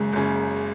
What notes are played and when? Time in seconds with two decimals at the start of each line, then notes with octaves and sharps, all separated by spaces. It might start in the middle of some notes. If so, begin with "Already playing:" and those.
Already playing: F#1 F#2 C#3 G#3
0.13 F#1 F#2 C#3